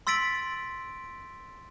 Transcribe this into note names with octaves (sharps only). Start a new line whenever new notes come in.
C6 E6 A6 B6 D7 F#7